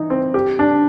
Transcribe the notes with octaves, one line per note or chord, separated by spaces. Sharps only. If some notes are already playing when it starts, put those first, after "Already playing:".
Already playing: E3 D#4
C4
G4
D4